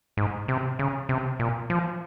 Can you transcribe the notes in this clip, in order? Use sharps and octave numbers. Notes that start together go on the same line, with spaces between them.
G#2
C3
C#3
C3
A#2
F3